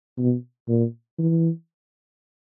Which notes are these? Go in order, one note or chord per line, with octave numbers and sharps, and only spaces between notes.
B2
A#2
E3